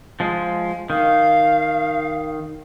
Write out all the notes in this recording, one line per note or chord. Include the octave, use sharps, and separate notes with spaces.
F3 G#3
D#3 F5